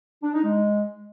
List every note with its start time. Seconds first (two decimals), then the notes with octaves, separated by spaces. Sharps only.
0.23 D4
0.34 D#4
0.44 G#3